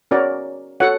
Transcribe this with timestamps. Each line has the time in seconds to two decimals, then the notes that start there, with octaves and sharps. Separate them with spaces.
0.11 C#4 F#4 A#4 C#5 D5
0.80 F#4 A4 C#5 F#5